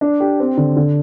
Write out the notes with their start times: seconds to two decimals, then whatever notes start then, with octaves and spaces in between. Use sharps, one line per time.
0.01 D4
0.20 G4
0.40 C4
0.57 D3
0.77 D3